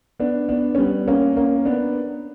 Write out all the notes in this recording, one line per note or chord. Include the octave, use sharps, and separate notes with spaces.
B3 D4
B3 D4
C#4
G3 B3
A#3 C#4
A#3 C#4
B3 D4